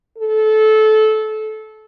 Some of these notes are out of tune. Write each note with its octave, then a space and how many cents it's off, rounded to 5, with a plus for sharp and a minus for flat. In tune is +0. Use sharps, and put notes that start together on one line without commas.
A4 -20